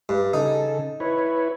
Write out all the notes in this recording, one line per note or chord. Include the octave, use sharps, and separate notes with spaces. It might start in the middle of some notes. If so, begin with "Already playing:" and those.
G2
C#3 D#4 A4
E4 B4 C#5